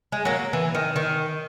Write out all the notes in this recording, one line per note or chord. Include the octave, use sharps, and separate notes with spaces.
G#3
F#3 A#3
E3
D#3
D#3